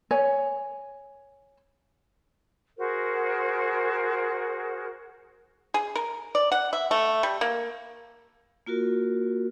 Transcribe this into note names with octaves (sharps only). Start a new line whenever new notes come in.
C#5 G#5
F#4 G#4 A#4 C5
G#4
A#4
D5
F#5
E5
A3
G3
A#3
A#3 F4 F#4 A#4